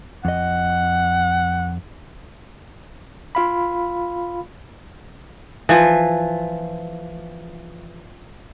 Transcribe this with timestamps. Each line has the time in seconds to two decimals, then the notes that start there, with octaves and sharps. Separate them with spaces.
0.25 F2 D#5 F#5
3.35 F4 F5 B5
5.69 E3 F3